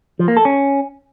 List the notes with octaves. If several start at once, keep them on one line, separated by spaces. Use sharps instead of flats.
F3
A#3
A4
C#4